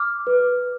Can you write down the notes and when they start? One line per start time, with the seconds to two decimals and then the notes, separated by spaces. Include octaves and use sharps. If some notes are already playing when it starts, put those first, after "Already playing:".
Already playing: D6 F6
0.27 B4